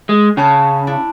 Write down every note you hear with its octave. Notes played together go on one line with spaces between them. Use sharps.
G#3
C#3 G5 A5 F#6
D4 E4